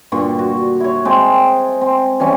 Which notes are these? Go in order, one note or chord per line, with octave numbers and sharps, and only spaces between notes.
G2 A#2 D3 C#6
F#4
E4 C#5
G#3 C4 A4 G5
C4
E3 G3 C#4